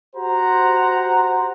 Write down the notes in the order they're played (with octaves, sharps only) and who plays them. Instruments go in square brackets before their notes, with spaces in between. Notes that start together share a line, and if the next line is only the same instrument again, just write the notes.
[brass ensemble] F#4 G4 C5 F#5 A#5